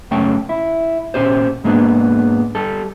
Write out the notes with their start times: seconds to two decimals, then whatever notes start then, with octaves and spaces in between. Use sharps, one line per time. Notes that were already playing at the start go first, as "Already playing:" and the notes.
0.11 C#2 F#2 A3 C#4 G5
0.49 E4
1.14 A#2 C#4 G4 C5
1.64 G#2 G#3 A#3 B3 D4
2.55 G3 G4 A4